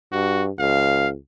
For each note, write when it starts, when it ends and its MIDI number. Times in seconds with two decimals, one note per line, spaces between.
0.12 0.50 43
0.12 0.44 66
0.59 1.15 37
0.59 1.08 77